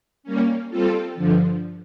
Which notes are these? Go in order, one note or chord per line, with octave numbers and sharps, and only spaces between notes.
G3 A#3 C#4
G3 C4 F4 A4
G2 D3 F3